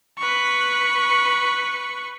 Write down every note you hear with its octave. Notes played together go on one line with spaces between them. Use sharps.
B4 C#6